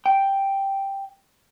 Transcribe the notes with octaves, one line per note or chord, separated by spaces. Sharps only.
G5